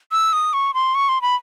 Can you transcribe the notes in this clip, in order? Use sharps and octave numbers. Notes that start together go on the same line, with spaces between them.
E6
D#6
C#6
C6
C#6
C6
B5